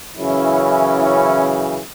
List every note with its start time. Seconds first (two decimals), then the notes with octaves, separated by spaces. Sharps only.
0.17 F#2 C#3 E3 C#4 E4
1.00 C#4 E4